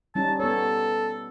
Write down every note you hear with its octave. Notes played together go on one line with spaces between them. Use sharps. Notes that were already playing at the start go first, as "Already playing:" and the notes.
G3 C#4 D#4 A5
B3 A4 C#5